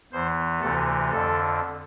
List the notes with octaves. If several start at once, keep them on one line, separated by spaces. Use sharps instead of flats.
E2 E3 C5
D2 C3 E3 A4
F2 D3 A4